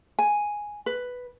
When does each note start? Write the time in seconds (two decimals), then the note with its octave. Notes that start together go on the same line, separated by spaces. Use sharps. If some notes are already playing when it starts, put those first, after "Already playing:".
0.19 G#5
0.86 B4